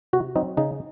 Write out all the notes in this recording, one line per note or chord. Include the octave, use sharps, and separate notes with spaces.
C3 F#4
F#3 C4 D#4
C#3 D#4